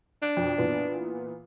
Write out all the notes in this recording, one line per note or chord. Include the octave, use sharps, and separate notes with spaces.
D4
F2 B2
A#2 E3 B3